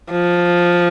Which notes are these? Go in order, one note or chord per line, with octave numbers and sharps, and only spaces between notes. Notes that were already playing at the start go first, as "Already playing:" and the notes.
F3